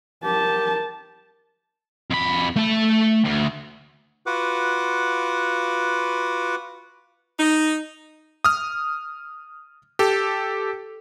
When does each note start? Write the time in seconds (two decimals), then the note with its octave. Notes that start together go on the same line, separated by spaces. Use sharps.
0.24 G4 A#4 A5
2.11 F2 B5
2.56 A3 A5
3.25 D2
4.26 F4 F#4 B4 F#5 D6
7.39 D#4
8.44 D#6 F6
9.99 G4 A4